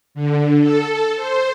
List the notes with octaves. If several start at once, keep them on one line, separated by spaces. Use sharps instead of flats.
D3
A4
C5